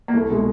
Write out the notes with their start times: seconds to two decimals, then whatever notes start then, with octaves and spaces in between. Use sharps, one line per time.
0.08 A#3
0.14 C2 A3
0.31 B2 G#3